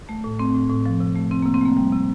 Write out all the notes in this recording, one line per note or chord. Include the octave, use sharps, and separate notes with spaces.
A3
A2
A3 C4
A2
A2
F3
C3
A3
C3 C4
A#3
C3
C4
A3 A#3
G3
C3